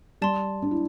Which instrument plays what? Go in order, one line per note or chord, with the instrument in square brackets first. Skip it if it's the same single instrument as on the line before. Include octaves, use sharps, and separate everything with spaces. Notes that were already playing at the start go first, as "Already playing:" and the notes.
[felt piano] G3 [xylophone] D5 A5 C6
[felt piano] D4
E4